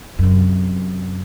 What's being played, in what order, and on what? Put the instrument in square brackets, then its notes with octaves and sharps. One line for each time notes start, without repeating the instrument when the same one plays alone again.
[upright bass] F#2 C3